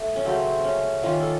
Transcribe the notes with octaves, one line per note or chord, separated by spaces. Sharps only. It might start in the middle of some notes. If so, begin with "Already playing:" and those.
Already playing: A3
C#4
C#3 F#3 A3 C4
C#4
D#3 A#3 C#4 F4
A4